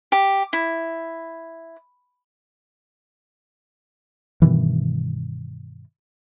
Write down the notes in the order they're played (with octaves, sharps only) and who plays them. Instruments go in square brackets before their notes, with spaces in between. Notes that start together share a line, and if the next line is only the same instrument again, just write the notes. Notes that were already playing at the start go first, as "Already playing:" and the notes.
[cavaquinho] G4
E4
[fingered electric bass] G2 B2 D#3 E3